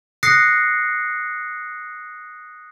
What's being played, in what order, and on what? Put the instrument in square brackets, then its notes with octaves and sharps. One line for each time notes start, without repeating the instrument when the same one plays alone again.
[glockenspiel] D#6 F#6 A#6 C7 C#7